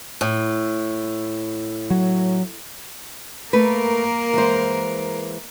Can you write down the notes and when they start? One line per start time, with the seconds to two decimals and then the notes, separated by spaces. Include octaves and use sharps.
0.21 A2
1.90 F#3
3.53 A3 A#3 A#4 B4
4.33 E3 G#3 C5